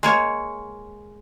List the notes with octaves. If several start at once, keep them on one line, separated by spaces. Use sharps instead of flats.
G#3 A#3 C#5